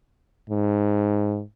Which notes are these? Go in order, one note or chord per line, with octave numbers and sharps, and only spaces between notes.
G#2